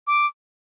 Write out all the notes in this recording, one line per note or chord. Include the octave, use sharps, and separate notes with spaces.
D6